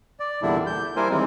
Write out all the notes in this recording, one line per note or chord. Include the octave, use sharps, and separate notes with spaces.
D5
E2 A#2 D3 G3 D4 E4
G6
G3 A#3 E4 A#4 C5 G#5
D#2 E3 G3 G#3 C4